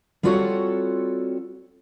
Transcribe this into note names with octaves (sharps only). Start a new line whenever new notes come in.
G3 C4 F4 F#4 A4 C#5